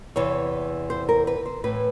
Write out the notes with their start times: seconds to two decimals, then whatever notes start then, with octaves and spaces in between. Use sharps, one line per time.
0.16 E2 C3 E3 C#5
0.90 C5
1.09 A#4
1.27 B4
1.46 C5
1.64 A2 E3 B4